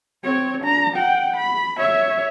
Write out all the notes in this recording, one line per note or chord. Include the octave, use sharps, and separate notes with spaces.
C4 C#5
D4 A#5
F#5 G5
B5
C#5 E5